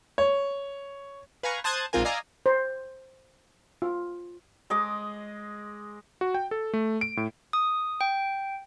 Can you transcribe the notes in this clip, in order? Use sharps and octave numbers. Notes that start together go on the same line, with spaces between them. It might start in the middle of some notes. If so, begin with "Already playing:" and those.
C#5
B4 F5 G#5 A#5 C#6
C5 A5 D#6 F#6 G#6
A#1 G#2 C4 F4 A#4 G#5
D5 D#5 F5 G#5 A#5 E6
C5
F4
G#3 D#5 D6
F#4
G5
A4
A3
D7
A2
D#6
G5